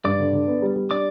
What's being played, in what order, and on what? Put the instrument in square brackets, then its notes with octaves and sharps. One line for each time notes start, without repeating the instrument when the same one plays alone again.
[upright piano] G2 [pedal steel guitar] D5 D6
[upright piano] D3
D3
B3
G3
G3
[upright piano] D4 [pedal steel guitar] D5 D6